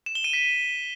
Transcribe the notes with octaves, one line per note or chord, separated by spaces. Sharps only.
E7
G7
D#7
B6